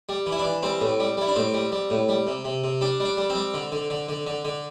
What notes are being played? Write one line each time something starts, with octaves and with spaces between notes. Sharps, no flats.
G3
E3
E4
D4
E3
G3 C4
A2
G3
G3 E4
D4
A2 C4
G3
G3
A2
G3
C3
C3
C3
G3 D4
G3
D4
G3
C4
G3
D3
D3
D3
D3
D3
D3